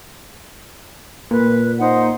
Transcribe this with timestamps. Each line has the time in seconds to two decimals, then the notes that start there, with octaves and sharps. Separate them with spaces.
1.31 A#2 B4
1.79 D#4 C5 F#5